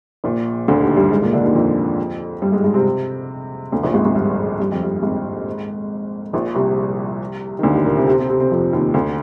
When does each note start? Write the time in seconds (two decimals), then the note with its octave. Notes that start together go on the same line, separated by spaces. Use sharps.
0.24 A#1 A#2
0.68 D2 D3
0.82 D#2 D#3
0.96 G2 G3
1.11 G#2 G#3
1.22 A#2 A#3
1.33 D3 D4
1.43 D#2 D#3
1.55 F2 F3
2.42 G2 G3
2.52 G#2 G#3
2.64 G#2 G#3
2.74 C3 C4
3.72 D2 D3
3.83 A#1 A#2
3.94 G#1 G#2
4.05 G#1 G#2
4.15 G2
4.60 G2
4.72 F2
4.83 G2
5.02 G#1 G#2
6.33 A#1 A#2
6.55 C2 C3
7.59 D#3
7.63 D2 D3
7.75 D#2 D#3
7.85 A#2 A#3
7.96 C3 C4
8.07 C3 C4
8.18 C3 C4
8.29 C3 C4
8.40 C3 C4
8.51 F2 F3
8.73 D#2 D#3
8.94 D2 D3